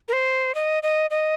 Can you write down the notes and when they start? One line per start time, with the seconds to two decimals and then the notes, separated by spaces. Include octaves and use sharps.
0.08 A#4
0.13 C5
0.55 D#5
0.83 D#5
1.10 D#5